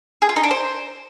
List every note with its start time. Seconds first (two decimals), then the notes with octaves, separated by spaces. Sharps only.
0.22 G#4
0.29 F4
0.36 D#4
0.43 D4
0.51 C5